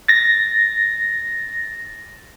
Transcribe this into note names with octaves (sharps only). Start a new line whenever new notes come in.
A6 A#6